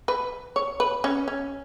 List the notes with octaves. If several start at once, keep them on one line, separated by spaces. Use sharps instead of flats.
B4
C#5
B4
C#4
C#4